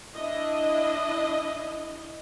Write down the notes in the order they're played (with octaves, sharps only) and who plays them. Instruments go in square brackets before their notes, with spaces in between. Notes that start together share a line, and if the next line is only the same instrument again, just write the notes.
[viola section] D4 E4 D#5